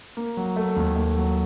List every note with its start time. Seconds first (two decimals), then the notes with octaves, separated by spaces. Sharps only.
0.17 A#3
0.37 F#3
0.56 A3
0.76 D#2
0.96 A3
1.17 F#3